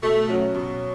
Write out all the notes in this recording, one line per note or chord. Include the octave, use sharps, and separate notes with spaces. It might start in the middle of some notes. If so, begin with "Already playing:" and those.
B2 A3
F#3 C#4 F#4
B2